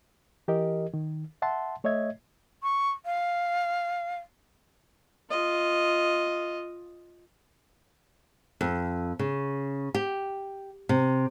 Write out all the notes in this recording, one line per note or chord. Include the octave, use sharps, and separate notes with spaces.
E3 G4 A#4 D#5
D#3
E5 F#5 A5 C6
A3 C#5 D#5 E5 G#6
C#6
F5
F4 D#5
F2
C#3
G4
C3